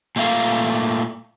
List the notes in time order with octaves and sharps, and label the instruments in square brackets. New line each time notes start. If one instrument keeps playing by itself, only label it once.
[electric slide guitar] A#2 A3 A#3 F5